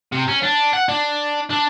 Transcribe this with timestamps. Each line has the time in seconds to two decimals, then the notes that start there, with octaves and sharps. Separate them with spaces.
0.12 C3
0.28 C#4
0.43 D4
0.73 F#5
0.89 D4
1.50 D4